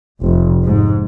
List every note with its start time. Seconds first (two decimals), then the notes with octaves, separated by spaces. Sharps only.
0.23 F1
0.63 G#2